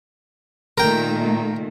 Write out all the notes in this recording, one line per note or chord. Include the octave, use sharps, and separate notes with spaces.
A#2 D#3 A3 A#4 G5